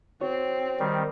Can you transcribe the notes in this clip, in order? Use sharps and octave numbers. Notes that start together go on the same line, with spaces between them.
C4 F#4 C#5
D#3 G3